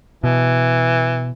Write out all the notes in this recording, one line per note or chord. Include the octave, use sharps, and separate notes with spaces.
B2 E3